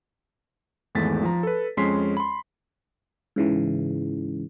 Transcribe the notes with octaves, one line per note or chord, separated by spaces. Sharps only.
G#1 E2 G#3 A3 A6 B6
F3 A#5
A4 B4
F2 G#3 C#4 C6 B6 C7
B5 C6
G#2 C#3 E3